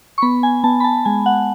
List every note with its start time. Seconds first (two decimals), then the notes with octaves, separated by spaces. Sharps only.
0.18 C#6
0.22 B3 B5
0.43 G#5
0.64 B3 A5
0.80 B5
0.84 A5
1.05 G#3 G#5
1.26 F#5